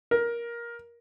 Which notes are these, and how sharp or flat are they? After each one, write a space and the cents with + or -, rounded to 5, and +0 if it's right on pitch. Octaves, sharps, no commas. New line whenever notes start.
A#4 +15